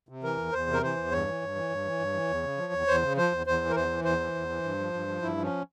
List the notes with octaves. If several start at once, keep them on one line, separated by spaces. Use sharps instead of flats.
C3
E3 A#4
E2
E2 C5
C3
A#4
E3 C5
E2
G2 C#5
E3
G2
E3
G2
E3
G2
E3
E2
C#3
F3
E2
E2 C5
C#3
F3 C5
E2
E2 C5
E3
A#4
E2 C5
E3
E2 C5
E3
E2
E3
G2
F3
G2
F3
G2 E4
F3
C#4